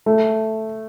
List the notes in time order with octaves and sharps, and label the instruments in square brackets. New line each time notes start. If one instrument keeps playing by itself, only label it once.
[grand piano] A3